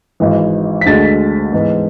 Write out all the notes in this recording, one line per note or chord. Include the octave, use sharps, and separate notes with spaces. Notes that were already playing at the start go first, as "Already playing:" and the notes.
G#1 G#2 E3
B6
D2 D3 G#3 A6
G#2 E3 B3